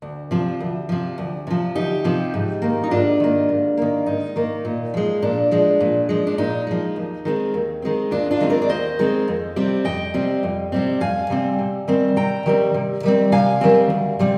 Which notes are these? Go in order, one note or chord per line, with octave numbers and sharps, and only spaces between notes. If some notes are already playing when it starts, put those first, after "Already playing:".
D2
C3 F3
D2
C3 F3
D2
C3 F3
D2 D#4 G4
C3 F3
G#2
D#3 A#3
D#4
G#2 D4 F4
D#3 A#3
G#2
D#3 A#3
G#2 D#4
D#3 A#3
A#2
F3 G#3
A#2 D4
F3 G#3
A#2
F3 G#3
D4
A#2 D#4
F3 G#3
D#2
D#3 G#3 C4
D#2
D#3 G#3 C4
D#2 D4 F4
D4 F4
D#3 G#3 C4
A#4 D5
D5
D#2 C5 D#5
D#3 G#3 C4
F2
C3 G3 C4
F2 D#5 G5
C3 G3 C4
F2
C3 G3 C4
F2 F5 G#5
C3 G3 C4
C3
D#3 G3 C4
C3 G5 A#5
D#3 G3 C4
C3
D#3 G3 C4
C3 F5 G#5
D#3 G3 C4
D2
C3 G3 C4